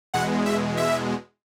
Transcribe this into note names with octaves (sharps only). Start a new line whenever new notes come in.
E2 B2 G#3 F#5
E5
E5